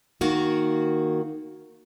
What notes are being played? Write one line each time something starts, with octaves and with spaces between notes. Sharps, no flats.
D#3 A#3 F#4